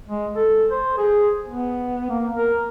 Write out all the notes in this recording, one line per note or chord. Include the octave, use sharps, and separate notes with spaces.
G#3
A4
C5
G#4
B3
A#3
A#4